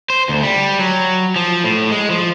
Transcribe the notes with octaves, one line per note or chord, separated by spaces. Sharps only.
C5
D2
G3
F#3
F3
A2
G#3
F3